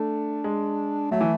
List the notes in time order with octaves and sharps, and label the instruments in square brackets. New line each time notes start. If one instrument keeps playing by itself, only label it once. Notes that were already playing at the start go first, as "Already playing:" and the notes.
Already playing: [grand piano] A3 [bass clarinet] D4
[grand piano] G#3
[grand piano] F#3 [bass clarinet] A3
[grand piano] E3